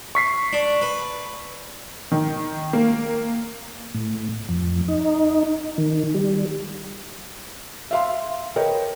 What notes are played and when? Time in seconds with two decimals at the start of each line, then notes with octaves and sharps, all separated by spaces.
0.15 C#6 B6 C7
0.53 D4
0.81 B4
2.12 D#3
2.73 A#3
3.94 A2
4.49 F2
4.88 D#4
5.78 D#3
6.15 G3
7.91 E5 F5 C6
8.56 A#4 B4 C#5 D#5 G5